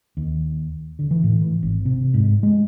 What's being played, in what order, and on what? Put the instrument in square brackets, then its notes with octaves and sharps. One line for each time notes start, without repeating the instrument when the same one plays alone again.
[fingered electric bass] D#2
D3
E3
A2
E3
G#1
C3
G#2
G#3